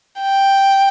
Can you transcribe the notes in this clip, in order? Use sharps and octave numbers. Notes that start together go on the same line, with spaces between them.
G5